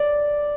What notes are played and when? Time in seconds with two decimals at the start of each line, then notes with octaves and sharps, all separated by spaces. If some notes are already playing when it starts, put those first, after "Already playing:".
Already playing: D5